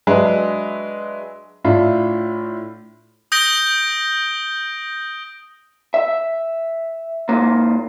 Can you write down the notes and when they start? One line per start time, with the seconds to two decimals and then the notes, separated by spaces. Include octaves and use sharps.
0.07 F#3 G#3 D4 B4 E5
1.64 A2 D4 E4 F4
3.32 D#6 G6 A#6 D7 G7
5.94 E5
7.29 G#2 A#3